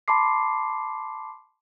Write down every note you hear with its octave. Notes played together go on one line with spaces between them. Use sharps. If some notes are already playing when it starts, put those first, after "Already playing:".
A5 B5 C6 D6 C7